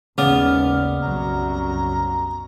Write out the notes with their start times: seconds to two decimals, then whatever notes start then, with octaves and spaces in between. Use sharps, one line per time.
0.18 G#1 D#2 C#3 B3 D5 F6
1.01 C2 F#2 F#3 A#5